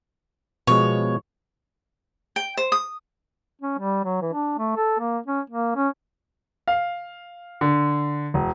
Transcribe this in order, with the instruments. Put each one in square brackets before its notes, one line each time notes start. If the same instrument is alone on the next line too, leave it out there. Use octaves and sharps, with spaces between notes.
[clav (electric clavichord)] B2 F3 G#3 [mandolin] C#5
[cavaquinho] G5
C5
D#6
[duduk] C#4
G3
F#3
E3
D4
A3
A4
A#3
C#4
A#3
C#4
[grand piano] F5
D3
E1